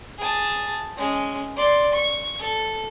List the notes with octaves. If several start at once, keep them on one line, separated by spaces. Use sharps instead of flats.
G#4 A5
G#3 C#4
D5 C6
C#6
A4